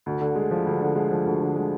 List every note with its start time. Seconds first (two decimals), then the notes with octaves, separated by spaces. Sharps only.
0.06 D2
0.21 D3
0.36 G#3
0.51 F3
0.66 D2
0.81 D3
0.96 G#3
1.11 F3
1.26 D2
1.40 D3
1.55 G#3